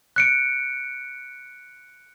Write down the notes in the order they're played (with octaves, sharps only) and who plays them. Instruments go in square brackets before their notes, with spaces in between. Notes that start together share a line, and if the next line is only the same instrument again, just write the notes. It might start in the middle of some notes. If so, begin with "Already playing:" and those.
[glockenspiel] F#6 C#7 D7